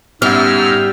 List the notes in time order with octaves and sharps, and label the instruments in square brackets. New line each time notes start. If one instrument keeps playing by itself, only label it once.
[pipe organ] G#2 E6 [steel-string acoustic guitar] G3 [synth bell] B3 C#4 [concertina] F6